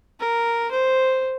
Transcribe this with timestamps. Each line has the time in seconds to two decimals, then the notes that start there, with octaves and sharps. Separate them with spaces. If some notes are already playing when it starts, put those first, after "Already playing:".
0.20 A#4
0.71 C5